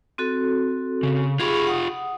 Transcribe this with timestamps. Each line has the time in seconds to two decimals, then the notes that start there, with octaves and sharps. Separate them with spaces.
0.18 C4 F#4 A4
1.03 C#3
1.40 F4 G4 G#4 B5 C#6
1.67 F#5 D#6